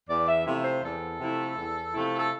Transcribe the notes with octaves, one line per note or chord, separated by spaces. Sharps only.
E2 D5
E5
C3 F3 A3 E4 E5
C5
E2 A4
C3 F3 A3 E4
E2
C3 F3 A3 E4
A4